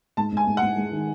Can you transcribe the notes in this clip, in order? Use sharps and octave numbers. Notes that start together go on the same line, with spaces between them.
G#2 A5
G#2 G#5
G#2
F#5
G#2
G#3
D#3